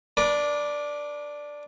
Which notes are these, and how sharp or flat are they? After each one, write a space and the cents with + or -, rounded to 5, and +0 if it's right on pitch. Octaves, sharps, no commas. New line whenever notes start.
D4 +0 B4 -45 D5 +0